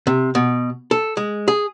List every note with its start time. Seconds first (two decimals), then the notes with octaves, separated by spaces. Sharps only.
0.07 C3
0.35 B2
0.91 A4
1.17 G#3
1.48 G#4